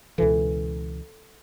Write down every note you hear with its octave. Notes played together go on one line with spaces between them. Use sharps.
C#2 B2 E3 A4